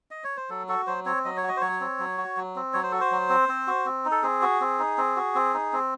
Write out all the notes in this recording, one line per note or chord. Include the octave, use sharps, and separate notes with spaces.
D#5
C#5
C5
F#3 A4
F#4 A4
F#3 C5
C4 C#5
F#3 D#5
C#5
F#4
D#5
C5
F#3 C#5
C4
F#3
F#4
F#3
C4
F#3 C#5
C5
F#4 A4
C5
F#3
C4
C4
F#4
C4
D#4
A4
C4 G#4
F#4
C4
D#4
C4
F#4
C4
D#4
C4